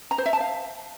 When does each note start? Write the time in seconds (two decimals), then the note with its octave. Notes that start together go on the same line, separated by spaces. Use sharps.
0.11 A#5
0.18 C5
0.26 E5
0.33 A5
0.40 F5